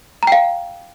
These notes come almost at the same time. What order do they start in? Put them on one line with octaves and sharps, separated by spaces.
A#5 G5 F5